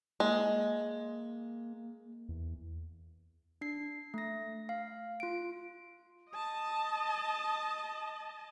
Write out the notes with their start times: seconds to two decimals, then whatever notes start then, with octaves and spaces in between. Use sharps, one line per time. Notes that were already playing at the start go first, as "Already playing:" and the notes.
0.20 G#3 A#3
2.29 E2
3.61 D4 C7
4.14 A3 A#6
4.69 F5
5.20 F4 D7
6.32 D#5 A5 D#6